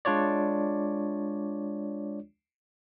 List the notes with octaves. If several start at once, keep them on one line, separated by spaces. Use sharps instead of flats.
G#3 D4 F4 C#5 D5